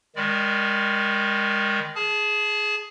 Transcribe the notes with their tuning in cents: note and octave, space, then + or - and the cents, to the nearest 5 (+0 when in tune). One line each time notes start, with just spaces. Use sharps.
D#3 +0 G#3 -25 D5 +0
G#4 +10 A5 -30